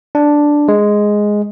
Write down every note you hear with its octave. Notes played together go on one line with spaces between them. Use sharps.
D4
G#3